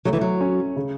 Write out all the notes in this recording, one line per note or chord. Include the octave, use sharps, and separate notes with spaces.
F#3 A3
E3
F#3
C#4
C#3